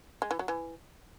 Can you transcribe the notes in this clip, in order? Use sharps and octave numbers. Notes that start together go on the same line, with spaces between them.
G#3
E3
F#3
E3